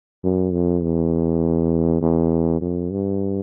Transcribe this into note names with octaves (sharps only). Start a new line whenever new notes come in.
F#2
F2
E2
E2
F2
G2